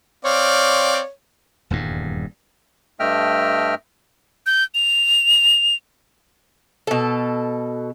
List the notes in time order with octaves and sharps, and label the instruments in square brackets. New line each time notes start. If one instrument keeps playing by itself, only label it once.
[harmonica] C4 D5 F5 [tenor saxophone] C#5
[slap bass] D#1 E2 G2
[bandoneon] G2 A3 D#5 E5 G5 F6
[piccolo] G6
F7
[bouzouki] B2 A4